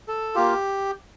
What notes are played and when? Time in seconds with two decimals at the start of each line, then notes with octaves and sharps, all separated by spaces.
0.08 A4
0.35 A#3 F4 G4